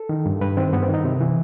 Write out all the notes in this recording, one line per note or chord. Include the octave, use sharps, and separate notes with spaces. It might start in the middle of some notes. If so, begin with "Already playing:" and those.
Already playing: A4
D#3
G2
G2 B4
D#3 C4
G2 B3
C4
D#3
D#4
C3 C4
E3